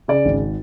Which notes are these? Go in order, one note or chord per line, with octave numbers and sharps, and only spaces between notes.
C#3 D5
G#1